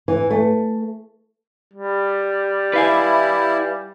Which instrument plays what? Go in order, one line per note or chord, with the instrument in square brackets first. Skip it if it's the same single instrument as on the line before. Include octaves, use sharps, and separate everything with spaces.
[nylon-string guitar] E3
A3
[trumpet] G3
[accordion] E4 [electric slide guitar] B4 F5 G#5